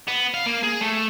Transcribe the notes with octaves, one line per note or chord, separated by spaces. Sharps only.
B3
F5
A#3
G#4
A3